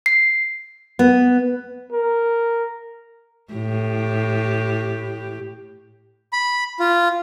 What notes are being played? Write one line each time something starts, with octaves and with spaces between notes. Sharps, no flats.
C7
B3
A#4
A2 G4
B5
F4